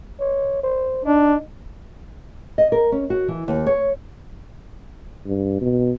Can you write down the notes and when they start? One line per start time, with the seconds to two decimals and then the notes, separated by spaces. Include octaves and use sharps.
0.19 C#5
0.63 C5
1.05 D4 D#4
2.58 D#5
2.72 A#4
2.92 C#4
3.10 F#4
3.28 E3
3.48 D#2
3.66 C#5
5.26 G2
5.61 B2